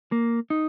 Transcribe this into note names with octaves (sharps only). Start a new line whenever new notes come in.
A#3
D#4